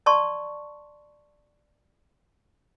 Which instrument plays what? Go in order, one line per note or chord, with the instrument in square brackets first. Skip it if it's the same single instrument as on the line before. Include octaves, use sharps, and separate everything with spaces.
[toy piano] D5 A5 C6 C#6